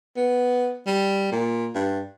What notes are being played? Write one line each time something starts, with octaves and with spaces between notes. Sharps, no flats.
B3
G3
A#2
G2